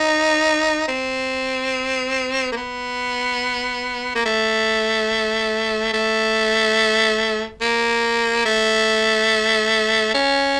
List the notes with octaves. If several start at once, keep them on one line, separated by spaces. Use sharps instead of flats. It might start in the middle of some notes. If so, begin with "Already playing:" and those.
Already playing: D#4
C4
A#3
B3
A#3
A3
A3
A#3
A3
C#4